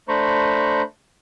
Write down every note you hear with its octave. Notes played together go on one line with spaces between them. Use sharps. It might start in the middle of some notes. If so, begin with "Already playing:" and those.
A3 D4 C5 A#5 B5 C#6